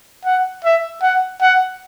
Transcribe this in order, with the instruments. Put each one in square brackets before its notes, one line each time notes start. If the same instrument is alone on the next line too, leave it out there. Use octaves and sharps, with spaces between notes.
[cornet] F#5
E5
F#5
F#5